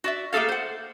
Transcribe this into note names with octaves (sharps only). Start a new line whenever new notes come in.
F#4 D5 E5
A3 A#3 G#4 A4 F5
C5 F#5